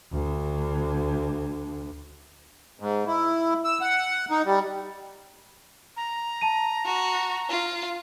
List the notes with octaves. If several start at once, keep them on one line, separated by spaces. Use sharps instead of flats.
D2 D3
G#2
E4
E6
F#5
D#4
G3
A#5
A5 D#7
F#4
F4